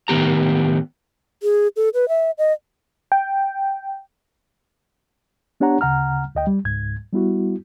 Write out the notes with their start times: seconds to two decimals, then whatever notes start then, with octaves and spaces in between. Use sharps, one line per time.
0.08 A2 D#3 B3 G4 A#5
1.43 G#4
1.76 A4
1.94 B4
2.09 E5
2.38 D#5
3.12 G5
5.60 B3 D4 G4 C#5 F#5 A#5
5.81 D2 C#3 F#5 A#5 F6
6.35 D2 D#5 G5
6.47 G3
6.64 C#2 G#2 G#6
7.13 G3 B3 E4 F#4